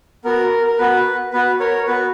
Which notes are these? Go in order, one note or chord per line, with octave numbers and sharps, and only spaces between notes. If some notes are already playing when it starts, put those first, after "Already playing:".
B3 F#4 A#4
A#4
B3 F#4 B4
B3 F#4 B4
A#4 C#5
B3 F#4 B4